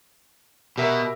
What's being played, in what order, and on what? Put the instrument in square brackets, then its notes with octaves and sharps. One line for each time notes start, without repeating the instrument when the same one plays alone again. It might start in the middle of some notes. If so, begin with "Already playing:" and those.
[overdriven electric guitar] B2 [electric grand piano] G4 A#4 E5